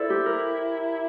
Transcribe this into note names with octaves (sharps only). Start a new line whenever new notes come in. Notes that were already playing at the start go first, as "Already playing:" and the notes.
Already playing: E4 A4 C5 D5
G4
A#4